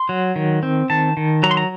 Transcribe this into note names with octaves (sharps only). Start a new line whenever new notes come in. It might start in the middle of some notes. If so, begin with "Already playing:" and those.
Already playing: C6
F#3
D#3
C4
D#3 A5
D#3
F#3 A#5
C6
A#5